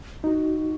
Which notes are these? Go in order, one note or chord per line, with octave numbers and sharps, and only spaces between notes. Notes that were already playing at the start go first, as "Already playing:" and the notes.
D#4 F#4